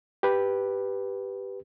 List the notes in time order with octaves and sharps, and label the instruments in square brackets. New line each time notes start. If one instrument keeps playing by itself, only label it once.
[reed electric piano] G4 B4